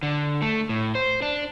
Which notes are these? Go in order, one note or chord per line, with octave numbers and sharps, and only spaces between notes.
D3
A3
A2
C5
D4